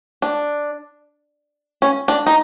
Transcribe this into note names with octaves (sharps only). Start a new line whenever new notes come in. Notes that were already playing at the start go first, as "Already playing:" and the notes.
D4
C#4
D4
D#4